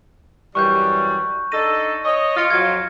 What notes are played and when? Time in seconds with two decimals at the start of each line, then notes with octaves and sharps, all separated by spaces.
0.55 F#2 E3 G3 C#6 F#6 G6
1.52 D4 D#4 A4 A#6 D#7
2.05 C#5 D#5
2.37 F4 F6 A#6 C#7
2.50 F2 F#3 F4 G#6